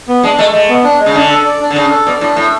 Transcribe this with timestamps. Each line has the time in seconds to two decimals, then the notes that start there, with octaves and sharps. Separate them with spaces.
0.08 B3
0.23 G#3 D4
0.38 G#3 A3
0.53 G#3 A3
0.69 B3
0.84 D4
0.99 G#3
1.06 C#3
1.14 D3 D4
1.30 A4
1.45 D5
1.61 D4
1.70 D3
1.75 C#3 D4
1.91 A4
2.06 B2 D5
2.21 A2 D4
2.36 A2 A3